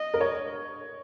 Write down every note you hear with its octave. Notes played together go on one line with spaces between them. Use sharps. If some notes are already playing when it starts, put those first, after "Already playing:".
Already playing: D#5
A#4
C#5